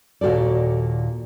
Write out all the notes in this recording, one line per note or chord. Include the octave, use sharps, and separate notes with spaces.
D#2 A#2 F#4 A4 D5